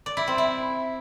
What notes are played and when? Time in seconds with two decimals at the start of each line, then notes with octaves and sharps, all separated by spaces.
0.06 D5
0.17 E4
0.27 C4
0.38 E4